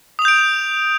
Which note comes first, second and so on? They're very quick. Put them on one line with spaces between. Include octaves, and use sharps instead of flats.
D#6 F7 G6 D7